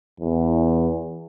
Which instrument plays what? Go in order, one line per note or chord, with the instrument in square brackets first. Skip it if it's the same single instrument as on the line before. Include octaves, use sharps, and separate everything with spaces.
[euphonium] E2